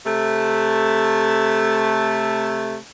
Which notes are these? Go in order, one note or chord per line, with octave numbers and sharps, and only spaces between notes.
C3 A3